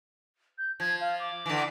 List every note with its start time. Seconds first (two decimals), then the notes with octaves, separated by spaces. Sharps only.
0.58 G6
0.80 F3 G#6
1.00 F5
1.20 D6
1.46 D3 E3